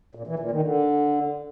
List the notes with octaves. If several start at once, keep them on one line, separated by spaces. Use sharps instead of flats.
A#2
E3
A#2
D#3
D3